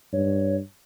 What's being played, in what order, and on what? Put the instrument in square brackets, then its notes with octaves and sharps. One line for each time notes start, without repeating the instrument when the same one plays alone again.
[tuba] G2 [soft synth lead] C#5